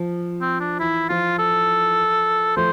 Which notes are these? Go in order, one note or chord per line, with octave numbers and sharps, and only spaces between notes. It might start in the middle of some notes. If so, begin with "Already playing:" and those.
Already playing: F3
C4
D4
E3 E4
F3 F4
A4
F3 A3 C5